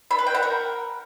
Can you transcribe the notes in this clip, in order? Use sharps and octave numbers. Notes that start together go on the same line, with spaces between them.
B5
B4
G5
F#5
A#4